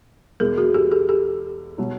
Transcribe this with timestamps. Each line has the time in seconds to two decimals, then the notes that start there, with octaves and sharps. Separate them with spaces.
0.40 E2 B2 G#3 G#4 A#4
0.58 F#4 G#4
0.74 G4 A4
0.91 G4 A4
1.09 G4 A4
1.78 B2 F#3